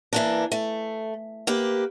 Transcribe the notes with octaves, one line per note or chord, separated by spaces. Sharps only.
E3 A#3 D4
A3
A#3 G4 B4